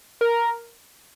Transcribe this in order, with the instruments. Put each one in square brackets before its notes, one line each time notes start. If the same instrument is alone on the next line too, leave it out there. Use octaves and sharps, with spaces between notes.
[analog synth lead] A#4